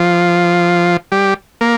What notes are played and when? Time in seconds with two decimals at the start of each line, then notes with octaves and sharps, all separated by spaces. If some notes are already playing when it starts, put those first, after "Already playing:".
Already playing: F3
1.12 G3
1.61 A#3